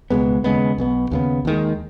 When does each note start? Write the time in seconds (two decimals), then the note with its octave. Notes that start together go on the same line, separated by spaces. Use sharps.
0.10 C#2 B2 G#3 B3
0.44 D#2 C#3 G#3 B3
0.78 B1 B2 B3
1.11 D#2 C#3 B3
1.45 D#2 D#3 G#3